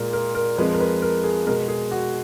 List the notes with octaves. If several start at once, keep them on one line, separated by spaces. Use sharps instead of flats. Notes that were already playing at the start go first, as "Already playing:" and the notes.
Already playing: A#2 G#3 A#4
A#4
A#4
F2 F3 G#3 B4
A#4
B4
A#4
G#4
B2 G#3 A#4
G#4
F#4